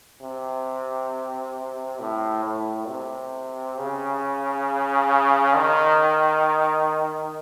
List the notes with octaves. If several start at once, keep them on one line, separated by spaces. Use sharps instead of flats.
C3
A2
A2
C3
C#3
D#3